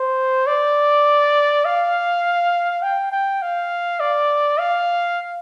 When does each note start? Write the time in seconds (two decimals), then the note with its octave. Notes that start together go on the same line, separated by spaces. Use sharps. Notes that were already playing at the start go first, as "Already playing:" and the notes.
Already playing: C5
0.47 D5
1.65 F5
2.82 G5
3.12 G5
3.42 F5
4.00 D5
4.59 F5